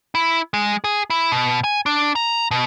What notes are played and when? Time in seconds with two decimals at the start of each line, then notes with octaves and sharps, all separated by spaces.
0.15 E4
0.54 G#3
0.84 G#4
1.10 E4
1.32 B2
1.64 G#5
1.86 D4
2.16 A#5
2.51 B2